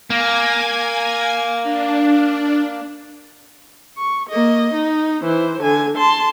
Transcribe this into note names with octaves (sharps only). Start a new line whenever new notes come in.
A#3 G#5 G#6
D4
C#6
A#3 D#5
D#4
E3 C5
D3 G#5
A5 C6